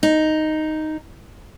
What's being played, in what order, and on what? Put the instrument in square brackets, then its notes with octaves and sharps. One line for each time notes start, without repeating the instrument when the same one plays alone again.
[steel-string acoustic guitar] D#4